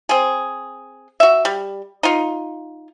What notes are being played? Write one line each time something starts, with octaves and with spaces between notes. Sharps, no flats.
C4 G#4
F#4 E5
G3
D#4 F4